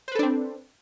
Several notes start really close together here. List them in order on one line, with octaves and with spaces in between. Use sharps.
C5 B4 A4 D4 C4